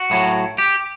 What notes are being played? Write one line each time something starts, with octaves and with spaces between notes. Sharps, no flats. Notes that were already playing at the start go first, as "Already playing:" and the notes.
Already playing: F#4
A2 F#3
G4